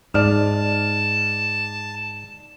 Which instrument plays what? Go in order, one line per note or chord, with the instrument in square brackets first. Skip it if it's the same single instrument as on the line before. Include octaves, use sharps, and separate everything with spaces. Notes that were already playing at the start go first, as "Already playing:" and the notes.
[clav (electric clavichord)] G#2 [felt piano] D5 F6 [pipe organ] A5